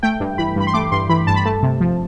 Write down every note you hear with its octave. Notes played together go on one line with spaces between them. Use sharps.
A3 G5
G2
E3 B5
G2 B5
C6
A3 D6
G2 C6
E3 B5
G2 A5
B5
A3 A5
C3
F3